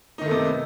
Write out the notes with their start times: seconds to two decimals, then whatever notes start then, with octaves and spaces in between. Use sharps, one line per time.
0.18 D#4
0.21 D#3
0.25 A3
0.28 B3
0.31 C3